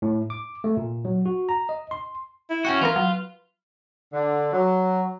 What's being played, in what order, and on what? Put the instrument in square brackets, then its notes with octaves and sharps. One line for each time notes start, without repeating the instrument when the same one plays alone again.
[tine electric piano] A2
D6
A3
A#2
F#3
F#4
A#5
D#5
C6
[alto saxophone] E4
[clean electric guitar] C#4 F#4 [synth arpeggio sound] F#5 G5 F#6
[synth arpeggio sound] E3 B3 A#4 [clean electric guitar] F4 [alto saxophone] B4
[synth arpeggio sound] F#3
[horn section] D3
F#3